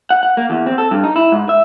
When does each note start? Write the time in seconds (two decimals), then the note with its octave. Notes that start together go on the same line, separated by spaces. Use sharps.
0.10 F#5
0.23 F#5
0.37 A#3
0.50 E2
0.66 C4
0.78 A4
0.91 G2
1.04 D#4
1.16 E4
1.32 G#2
1.49 E5